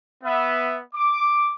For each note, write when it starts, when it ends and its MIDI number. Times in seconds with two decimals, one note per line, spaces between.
0.23 0.78 59
0.23 0.78 76
0.94 1.53 86